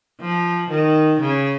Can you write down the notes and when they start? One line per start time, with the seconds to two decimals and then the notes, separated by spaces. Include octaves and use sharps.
0.21 F3
0.70 D#3
1.21 C#3